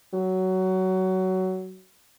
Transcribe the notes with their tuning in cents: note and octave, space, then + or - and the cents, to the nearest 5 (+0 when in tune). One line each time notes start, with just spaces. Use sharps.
F#3 +15